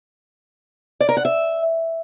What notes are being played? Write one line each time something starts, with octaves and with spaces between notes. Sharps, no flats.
D5
A#4
F#5
E5